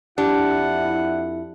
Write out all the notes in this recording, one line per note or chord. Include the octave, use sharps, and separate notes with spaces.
F2 D4 E4 G4 F#5